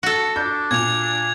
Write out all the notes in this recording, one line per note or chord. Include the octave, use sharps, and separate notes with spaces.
F#4 A4
D4 G6
A#2 G#6 F7